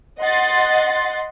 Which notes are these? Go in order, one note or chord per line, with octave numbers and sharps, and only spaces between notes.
D#5 F#5 C6 A6